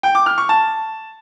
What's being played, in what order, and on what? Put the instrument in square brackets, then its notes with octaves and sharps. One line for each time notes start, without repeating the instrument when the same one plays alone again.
[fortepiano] G5
D6
F6
C#6
A5